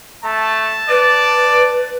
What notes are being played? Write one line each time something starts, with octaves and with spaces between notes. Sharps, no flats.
A3 A5
B4 D5